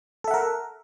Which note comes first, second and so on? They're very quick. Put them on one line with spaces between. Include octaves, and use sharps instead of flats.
A4 E5 F#5 A#4